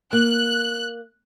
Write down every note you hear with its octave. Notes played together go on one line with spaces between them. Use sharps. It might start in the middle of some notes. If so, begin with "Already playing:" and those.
A#3 F#6